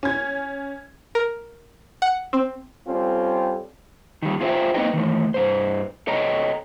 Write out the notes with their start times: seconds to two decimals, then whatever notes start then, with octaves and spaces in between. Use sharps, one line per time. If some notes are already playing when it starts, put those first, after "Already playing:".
0.03 C#4 G#6
1.15 A#4
2.02 F#5
2.33 C4
2.87 G3 C4 C#4 F4 A4
4.22 D#3 G3
4.41 F4 G#4 C5 D#5 E5 G5
4.74 A#3 C4 D#4 B4 D#5 G5
4.93 D#3 E3 A3
5.34 G2 C5
6.07 A4 C#5 D#5 G5 A#5